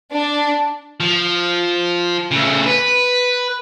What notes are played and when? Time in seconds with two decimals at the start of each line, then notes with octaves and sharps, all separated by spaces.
0.13 D4
1.00 F3
2.31 C#3 A3
2.66 B4